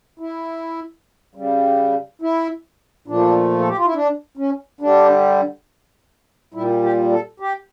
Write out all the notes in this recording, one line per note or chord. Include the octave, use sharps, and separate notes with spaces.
E4
C#3 G3
E4
A#2 F3 A3 D4
A4
G4
F4
E4
D4
C#4
D3 G3 D4
A#2 G3 E4
G4
A4
G4